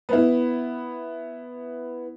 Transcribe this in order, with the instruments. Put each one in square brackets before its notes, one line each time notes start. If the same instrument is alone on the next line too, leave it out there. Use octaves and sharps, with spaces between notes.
[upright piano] B3 E4